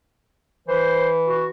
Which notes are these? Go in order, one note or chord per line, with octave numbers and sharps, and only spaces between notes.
E3 B4 C5
F#4